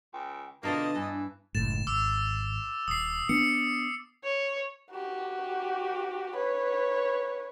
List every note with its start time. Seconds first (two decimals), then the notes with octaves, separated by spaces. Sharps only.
0.13 C#2 G5
0.63 B2 D3 A#3 D4 F4 D#5 A5
0.95 G2 E3
1.55 F#1 C#2 A2 A6 E7
1.87 G#1 D6 E6
2.88 D#1 D#6 C7
3.29 B3 D4 C#7
4.24 C#5
4.92 F#4 G4
6.37 B4 C#5